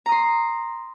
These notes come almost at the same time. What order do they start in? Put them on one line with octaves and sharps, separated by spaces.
A#5 D#6 C6